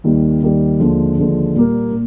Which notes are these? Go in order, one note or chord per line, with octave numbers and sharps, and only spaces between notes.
D#2 D#3 G3
D#2 D#3 G3
D#2 D3 F3 G#3
D#2 D3 F3 G#3
A#2 G3 A#3
A#2